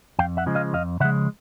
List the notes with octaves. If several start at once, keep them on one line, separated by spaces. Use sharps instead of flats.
F2 F5 G5
E5 F#5
C#3 F3 G#3
D#5 F5
F2 D#5 F5
C#3 F3 G#3 E5 F#5